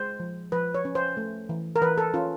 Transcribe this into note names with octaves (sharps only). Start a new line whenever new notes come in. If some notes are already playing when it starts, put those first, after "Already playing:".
Already playing: G#3 C5
F3
F3 B4
C#5
C#4
C5
A3
E3
A#4
E3 B4
A4
C#4 F4